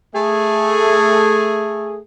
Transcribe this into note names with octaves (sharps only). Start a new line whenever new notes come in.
A3 G#4